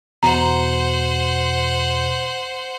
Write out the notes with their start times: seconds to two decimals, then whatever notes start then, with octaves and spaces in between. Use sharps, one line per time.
0.23 E2 B2 C5 F#5 A#5